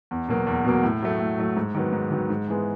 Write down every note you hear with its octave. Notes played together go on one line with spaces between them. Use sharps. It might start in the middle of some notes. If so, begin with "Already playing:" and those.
E2
B2 F#3 A#3
E2
B2 F#3 A#3
A2
F#3 A3
A2
F#3 A3
G#2
D#3 F#3 B3
G#2
D#3 F#3 B3
G#2
E3 G#3 B3